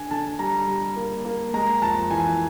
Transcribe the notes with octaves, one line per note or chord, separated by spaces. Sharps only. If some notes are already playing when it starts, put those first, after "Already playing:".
Already playing: D3 G#5
D3 A5
G3 A#5
G3
A#3
A#3
G#3 A#5
F2 A5
E3 G#5